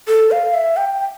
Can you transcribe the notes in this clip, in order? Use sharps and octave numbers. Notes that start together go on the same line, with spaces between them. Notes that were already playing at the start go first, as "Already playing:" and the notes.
A4
F5
E5
G5
G5